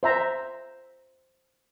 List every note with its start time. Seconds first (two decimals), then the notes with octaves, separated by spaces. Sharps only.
0.03 C5 E5 A#5